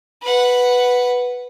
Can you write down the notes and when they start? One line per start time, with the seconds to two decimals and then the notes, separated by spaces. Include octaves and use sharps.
0.22 B4 F#5